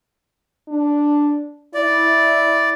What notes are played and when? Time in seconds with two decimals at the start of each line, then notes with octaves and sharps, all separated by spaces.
0.68 D4
1.74 E4 D5